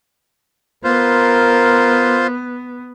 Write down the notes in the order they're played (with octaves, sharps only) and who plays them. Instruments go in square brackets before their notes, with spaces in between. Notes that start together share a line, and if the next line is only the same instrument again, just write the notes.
[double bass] B3 [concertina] F4 C5 [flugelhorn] A#4